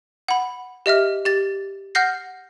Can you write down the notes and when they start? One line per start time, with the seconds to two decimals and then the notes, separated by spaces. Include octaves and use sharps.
0.28 F#5 B5
0.86 G4 D#5 E5 F6
1.25 G4 A6
1.95 F#5 F6 G6 A#6 C7